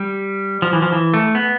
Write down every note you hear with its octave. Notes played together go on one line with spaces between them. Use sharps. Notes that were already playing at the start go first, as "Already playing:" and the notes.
Already playing: G3
F3
E3
F3
E3
A3
B3